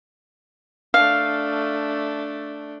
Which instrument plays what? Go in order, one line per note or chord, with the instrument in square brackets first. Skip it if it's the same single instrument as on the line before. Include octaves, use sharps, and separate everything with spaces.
[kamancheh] A3 D4 [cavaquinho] F5